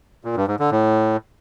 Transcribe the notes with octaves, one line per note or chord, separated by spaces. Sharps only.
A#2
G2
G#2
D3
A2